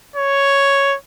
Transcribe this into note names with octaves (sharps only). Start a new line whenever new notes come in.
C#5